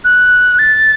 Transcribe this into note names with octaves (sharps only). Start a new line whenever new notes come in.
F#6
A6